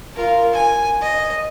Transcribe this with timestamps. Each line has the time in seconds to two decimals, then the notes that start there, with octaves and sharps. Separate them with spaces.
0.15 F4 A#4
0.53 G#5
1.02 D#5